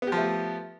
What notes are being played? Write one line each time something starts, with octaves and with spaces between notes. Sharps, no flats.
F3 A3 B3 G4